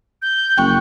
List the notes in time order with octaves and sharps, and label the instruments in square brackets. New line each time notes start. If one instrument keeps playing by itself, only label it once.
[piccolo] G6
[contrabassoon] F#1 [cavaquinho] G5 C#6 [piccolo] F#6